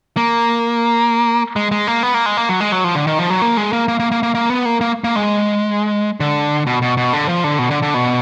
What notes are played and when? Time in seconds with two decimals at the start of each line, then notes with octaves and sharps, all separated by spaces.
0.17 A#3
1.56 G#3
1.71 G#3
1.87 A#3
2.03 B3
2.14 A#3
2.26 G#3
2.37 A#3
2.49 F#3
2.60 G#3
2.72 F#3
2.84 F3
2.95 D3
3.07 D#3
3.19 F3
3.30 F#3
3.42 A#3
3.57 G#3
3.73 A#3
3.88 A#3
4.00 A#3
4.12 A#3
4.23 A#3
4.35 A#3
4.50 B3
4.65 A#3
4.81 A#3
5.04 A#3
5.16 G#3
6.20 D3
6.67 B2
6.82 B2
6.97 B2
7.13 D3
7.29 F3
7.44 D3
7.59 B2
7.71 D3
7.82 D3
7.94 B2